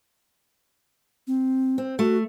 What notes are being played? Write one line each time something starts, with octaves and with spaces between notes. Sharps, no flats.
C4
C4
A3 F#4